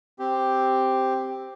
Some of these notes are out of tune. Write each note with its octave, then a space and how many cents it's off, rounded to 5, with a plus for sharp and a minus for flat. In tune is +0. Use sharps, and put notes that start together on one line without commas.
C4 +0 G4 +0